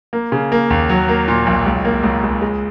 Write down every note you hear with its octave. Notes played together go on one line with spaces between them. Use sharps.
A#3
C#3
A#3
D#2
F#3
A#3
A#2
B1
C#2
A#3
C#2
C#2
G#3